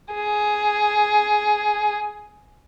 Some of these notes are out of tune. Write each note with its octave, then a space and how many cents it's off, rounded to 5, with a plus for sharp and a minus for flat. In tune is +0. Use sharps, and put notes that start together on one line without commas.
G#4 +10